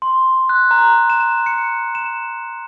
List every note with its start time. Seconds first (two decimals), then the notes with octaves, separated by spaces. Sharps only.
0.02 C6
0.49 F#6
0.71 A#5
1.10 E7
1.46 C#7
1.95 E7